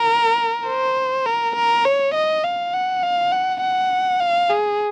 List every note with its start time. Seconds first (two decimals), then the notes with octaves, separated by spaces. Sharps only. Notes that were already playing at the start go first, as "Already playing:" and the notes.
Already playing: A#4
0.67 C5
1.26 A#4
1.56 A#4
1.86 C#5
2.15 D#5
2.44 F5
2.74 F#5
3.03 F5
3.32 F#5
3.62 F#5
4.21 F5
4.50 G#4